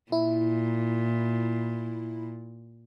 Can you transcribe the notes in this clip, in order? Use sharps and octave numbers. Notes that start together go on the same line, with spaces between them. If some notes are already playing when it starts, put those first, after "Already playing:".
A#2 E4